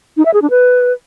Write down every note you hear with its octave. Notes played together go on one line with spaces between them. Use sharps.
D#4
E5
G#4
D4
B4